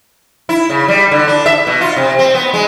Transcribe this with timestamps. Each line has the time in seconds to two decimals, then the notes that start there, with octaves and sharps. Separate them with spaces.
0.49 E4
0.70 C#3
0.88 G3
1.11 D3
1.28 D4
1.46 E5
1.67 B2
1.81 F4
1.96 C3
2.19 C4
2.35 B3
2.54 G#3